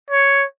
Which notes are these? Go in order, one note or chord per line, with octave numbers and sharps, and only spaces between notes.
C#5